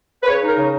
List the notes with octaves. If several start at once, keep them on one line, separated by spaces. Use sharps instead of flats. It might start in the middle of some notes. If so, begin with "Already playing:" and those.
B4
C#3 C#5
D#4
A#4
C#3